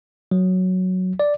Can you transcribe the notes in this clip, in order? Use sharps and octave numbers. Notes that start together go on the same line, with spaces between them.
F#3
D5